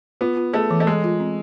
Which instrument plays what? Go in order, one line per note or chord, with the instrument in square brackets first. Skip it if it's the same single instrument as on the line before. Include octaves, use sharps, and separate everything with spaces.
[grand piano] B3 [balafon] F4
[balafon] F4
[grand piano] A3 [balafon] G#4
[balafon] E3
[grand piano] A3
[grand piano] G#3 [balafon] A4
[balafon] F4
C4